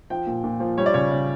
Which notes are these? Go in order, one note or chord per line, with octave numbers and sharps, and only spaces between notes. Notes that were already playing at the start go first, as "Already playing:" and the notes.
F3 G5
A#2
A#2
F3
G3 C#5
D5
C#3 C#5
C#3